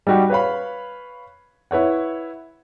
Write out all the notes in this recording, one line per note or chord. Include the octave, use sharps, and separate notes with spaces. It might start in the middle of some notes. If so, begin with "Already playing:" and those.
G3 D#4 F#4 G4
B4 C#5 F5 B5
E4 B4 C#5 F#5